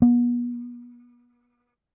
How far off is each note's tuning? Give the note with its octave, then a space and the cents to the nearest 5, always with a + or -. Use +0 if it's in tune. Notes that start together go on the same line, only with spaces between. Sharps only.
B3 -35